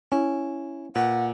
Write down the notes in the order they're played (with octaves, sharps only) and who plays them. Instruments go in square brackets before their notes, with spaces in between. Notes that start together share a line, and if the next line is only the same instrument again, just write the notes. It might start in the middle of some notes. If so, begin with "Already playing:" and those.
[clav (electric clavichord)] C#4 [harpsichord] E4
[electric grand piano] A#2 [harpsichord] B4 [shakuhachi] F#5